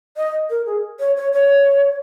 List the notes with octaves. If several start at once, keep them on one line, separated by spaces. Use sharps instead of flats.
D#5
A#4
G#4
C#5
C#5
C#5